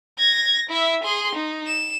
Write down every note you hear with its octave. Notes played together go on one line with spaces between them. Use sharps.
G#6 A#6
E4 E5
G#4 C6
D#4
E7